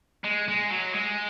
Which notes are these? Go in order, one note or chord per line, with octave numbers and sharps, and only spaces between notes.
G#3
G#3
F#3
G#3